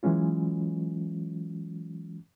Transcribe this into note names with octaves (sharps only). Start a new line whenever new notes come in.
E3 F#3 G#3 C#4 F4